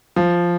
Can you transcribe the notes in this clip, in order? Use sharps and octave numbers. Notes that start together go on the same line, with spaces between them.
F3